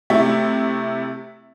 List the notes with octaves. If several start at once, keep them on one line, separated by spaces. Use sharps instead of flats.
C3 A3 E4